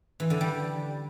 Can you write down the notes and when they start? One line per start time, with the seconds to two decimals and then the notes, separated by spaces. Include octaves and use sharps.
0.20 E3
0.30 D3
0.41 G3